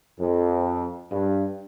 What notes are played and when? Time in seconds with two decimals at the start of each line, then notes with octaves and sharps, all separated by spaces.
0.19 F2
1.11 G2